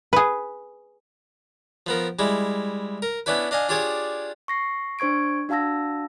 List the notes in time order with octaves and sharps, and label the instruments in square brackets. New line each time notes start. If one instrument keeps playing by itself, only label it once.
[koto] G#4 B4
[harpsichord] F3 B3 A#4
G3 G#3 E4
A#4
B3 C#4 D4 E4 B4
D4 D#5 F5 G#5
D4 F4 G4 G#4 C#5 D5
[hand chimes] C#6 A#6 C7
D4 C5 C#6 G#6 D7
D4 F#4 F5 A5 E6 A#6